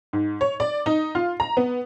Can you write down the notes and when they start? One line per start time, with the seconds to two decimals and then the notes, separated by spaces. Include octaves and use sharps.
0.13 G#2
0.41 C#5
0.60 D5
0.86 D#4
1.15 F4
1.40 A#5
1.57 B3